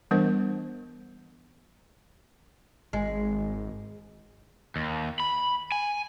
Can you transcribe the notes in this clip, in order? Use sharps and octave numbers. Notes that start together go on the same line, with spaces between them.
E3 G3 B3 D4 A#4 C5
G#1 G#3
D#2
B5
G#5